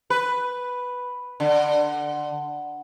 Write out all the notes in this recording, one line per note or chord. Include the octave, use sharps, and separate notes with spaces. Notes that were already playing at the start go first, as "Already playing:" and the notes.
B4
D3